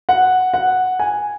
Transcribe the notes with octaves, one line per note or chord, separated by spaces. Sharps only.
F#5
F#5
G#5